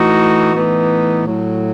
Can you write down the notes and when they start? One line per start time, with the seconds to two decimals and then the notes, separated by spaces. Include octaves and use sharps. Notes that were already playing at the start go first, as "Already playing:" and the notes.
Already playing: A2 E3 D#4 F#4
0.53 A2 E3 B3 D#4
1.24 A2 F#3